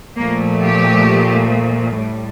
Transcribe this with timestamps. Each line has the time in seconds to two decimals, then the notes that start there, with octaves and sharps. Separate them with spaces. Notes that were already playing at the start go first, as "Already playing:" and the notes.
0.17 A#2 F3 A3 A#3
0.63 G4
1.99 A2 G3